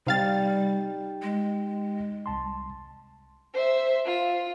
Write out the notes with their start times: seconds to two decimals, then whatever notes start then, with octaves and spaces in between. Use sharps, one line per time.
0.07 C3 G3 D#4 G4 F5 G5 A6
1.22 G#3
2.26 C2 A5 C6
3.54 C5 E5
4.05 F4